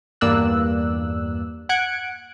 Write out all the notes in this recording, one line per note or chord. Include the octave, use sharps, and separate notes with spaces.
E2 G2 A#3 D5 E6 F#6
F#5 F#6 G#6 C#7 D7